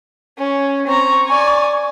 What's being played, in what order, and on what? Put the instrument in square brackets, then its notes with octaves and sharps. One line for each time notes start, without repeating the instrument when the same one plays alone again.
[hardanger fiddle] C#4
[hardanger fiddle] C4 A#5 [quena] C#6
[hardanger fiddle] D5 G#5